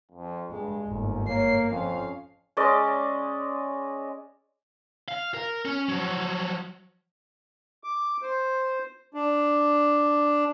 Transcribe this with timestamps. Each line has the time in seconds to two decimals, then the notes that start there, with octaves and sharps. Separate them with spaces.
0.12 F2
0.51 G2 G#3
0.88 G1 D#2 G#2
1.28 A#3 C#5 C7
1.70 F2 F3 C#4 F5
2.57 G#3 C#4 D5 D#5
5.08 F5
5.35 A#4
5.65 C#4
5.89 F3 F#3
7.84 D6
8.22 C5
9.14 D4